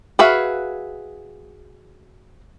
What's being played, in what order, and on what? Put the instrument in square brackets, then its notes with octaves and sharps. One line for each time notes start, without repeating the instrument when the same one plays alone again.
[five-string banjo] F#4 G#4 B4 E5 F5